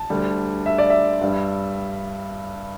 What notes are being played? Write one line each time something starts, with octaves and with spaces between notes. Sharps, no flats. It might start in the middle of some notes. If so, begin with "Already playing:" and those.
Already playing: A5
D2 D3 G3
E5
D5
E5
G2 G3